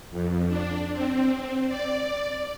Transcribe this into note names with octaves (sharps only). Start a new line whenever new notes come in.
F2
D4
C4
D5